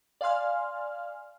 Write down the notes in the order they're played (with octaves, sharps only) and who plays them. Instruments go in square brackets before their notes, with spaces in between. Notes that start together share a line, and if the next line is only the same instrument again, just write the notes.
[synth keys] D5 F5 G#5 C6 F6